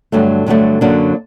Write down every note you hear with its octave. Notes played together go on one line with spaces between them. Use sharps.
G2 D3 F#3 A3
G2 D3 F#3 A3
F#2 D3 F#3 A#3 D4